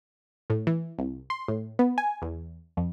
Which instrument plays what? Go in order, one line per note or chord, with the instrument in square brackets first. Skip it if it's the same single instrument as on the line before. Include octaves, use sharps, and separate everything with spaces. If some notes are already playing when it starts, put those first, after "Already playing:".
[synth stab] A2
E3
C2
C6
A2
B3
G#5
E2
F2